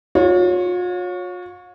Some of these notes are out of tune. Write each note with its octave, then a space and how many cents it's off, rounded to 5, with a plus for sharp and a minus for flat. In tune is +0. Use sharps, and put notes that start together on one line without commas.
F4 +45 C#5 +0